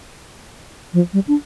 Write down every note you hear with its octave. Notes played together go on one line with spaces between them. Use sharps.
F3
G3
D4